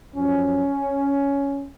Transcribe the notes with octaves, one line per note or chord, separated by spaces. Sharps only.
F#2 F3 C#4